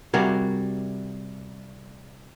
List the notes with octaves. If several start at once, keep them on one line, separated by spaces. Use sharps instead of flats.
C3 G3 F#4 G#4 A#4